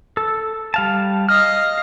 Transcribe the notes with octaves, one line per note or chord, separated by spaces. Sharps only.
A4
G3 F5 A5
D#5 F5 F6